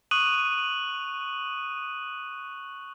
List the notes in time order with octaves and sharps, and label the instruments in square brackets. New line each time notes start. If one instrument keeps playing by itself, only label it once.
[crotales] C#6 D#6 F#6 D#7 F#7